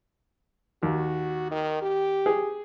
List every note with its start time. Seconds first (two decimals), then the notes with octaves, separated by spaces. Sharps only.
0.83 D#2 F#4
1.51 D#3
1.82 G4
2.26 G#4